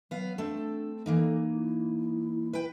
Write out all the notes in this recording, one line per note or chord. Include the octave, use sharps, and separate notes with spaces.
F#3 B3 F5
A3 C4 D4 A4
E3 A#3 D#4 A4
E4
B4 G5